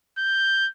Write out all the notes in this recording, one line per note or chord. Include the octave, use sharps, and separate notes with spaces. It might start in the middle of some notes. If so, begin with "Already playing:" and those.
G6